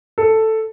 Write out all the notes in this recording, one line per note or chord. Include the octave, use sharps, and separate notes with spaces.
A4